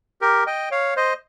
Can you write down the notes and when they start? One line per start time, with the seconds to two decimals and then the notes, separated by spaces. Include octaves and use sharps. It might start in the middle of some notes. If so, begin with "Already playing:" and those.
0.21 G4 A#4
0.47 D#5 G5
0.71 C#5 F5
0.96 C5 D#5